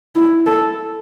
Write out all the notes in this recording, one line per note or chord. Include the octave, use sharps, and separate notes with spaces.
E4
A4